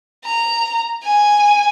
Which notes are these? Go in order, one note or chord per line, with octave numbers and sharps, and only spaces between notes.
A#5
G#5